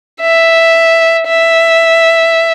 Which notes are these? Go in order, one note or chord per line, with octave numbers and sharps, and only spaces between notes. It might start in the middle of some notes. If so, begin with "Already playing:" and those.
E5
E5